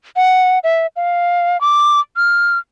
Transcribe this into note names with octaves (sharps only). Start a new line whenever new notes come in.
F#5
E5
F5
D6
F6